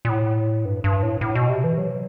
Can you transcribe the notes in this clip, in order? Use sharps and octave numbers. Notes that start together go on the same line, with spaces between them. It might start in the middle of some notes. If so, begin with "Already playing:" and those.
A#2
A2
G2
G2
A2
A2
B2
C3
E3
F#3